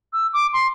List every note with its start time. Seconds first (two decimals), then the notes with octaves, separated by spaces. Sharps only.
0.13 E6
0.33 D6
0.53 C6